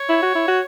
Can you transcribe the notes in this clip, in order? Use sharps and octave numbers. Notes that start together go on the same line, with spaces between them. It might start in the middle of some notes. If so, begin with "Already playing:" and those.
Already playing: C#5
E4
F#4
E4
F#4